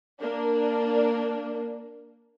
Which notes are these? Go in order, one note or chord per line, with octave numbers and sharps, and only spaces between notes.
A#3 D4